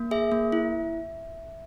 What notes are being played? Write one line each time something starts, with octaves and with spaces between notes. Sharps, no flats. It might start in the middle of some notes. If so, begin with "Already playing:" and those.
Already playing: A#3
G#4 E5
A#3
E4